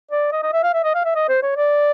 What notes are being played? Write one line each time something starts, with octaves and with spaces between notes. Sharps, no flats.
D5
D#5
D#5
E5
F5
E5
D#5
F5
E5
D#5
C5
C#5
D5